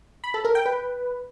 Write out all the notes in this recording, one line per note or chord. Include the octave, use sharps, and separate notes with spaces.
B5
A4
A#4
G5
B4